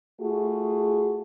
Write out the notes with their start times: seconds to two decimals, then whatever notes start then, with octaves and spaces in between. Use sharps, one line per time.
0.21 A3 F4 F#4 G#4